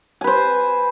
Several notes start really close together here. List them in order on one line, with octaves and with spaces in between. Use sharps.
G#5 B4 C5